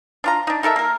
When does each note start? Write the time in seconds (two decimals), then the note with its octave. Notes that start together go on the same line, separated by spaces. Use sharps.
0.24 D4 F4 A#5
0.47 D4 D#4
0.63 D#4 A4 A#4 E5
0.76 A#3 A#4